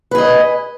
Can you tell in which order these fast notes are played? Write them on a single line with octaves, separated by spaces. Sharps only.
B4 G#4 D#5